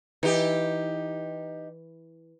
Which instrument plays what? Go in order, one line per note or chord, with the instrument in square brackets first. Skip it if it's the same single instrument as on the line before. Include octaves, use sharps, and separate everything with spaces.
[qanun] E3 [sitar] D#4 G4